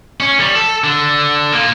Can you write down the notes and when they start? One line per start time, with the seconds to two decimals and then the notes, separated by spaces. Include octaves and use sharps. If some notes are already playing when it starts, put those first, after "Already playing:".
0.20 C#4
0.40 G3
0.55 A4
0.84 D3
1.52 A#3 F4